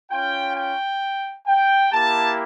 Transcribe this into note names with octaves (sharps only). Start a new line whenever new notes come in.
C#4 F4 G5
G5
G5
A#3 E4 G4 A5